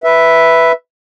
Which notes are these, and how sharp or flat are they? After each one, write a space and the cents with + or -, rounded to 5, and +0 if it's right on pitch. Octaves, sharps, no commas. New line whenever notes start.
B4 +0 E5 +0